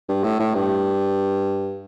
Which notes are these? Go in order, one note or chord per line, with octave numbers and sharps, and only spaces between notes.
G2
A2
A2
G2